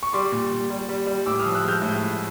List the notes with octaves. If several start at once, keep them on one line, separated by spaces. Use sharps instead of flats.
C#6
G3 C6 D6
A#2
A#2
G3
G3
G3
A2 D6 E6
D#6 F6
F3
E6 F#6
G#3 F6 G6
A2
A2